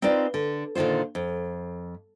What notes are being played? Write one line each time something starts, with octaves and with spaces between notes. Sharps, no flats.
C4 D#4 F4 B4 D5
D3
A#2 D3 D#3 F4 C5
F2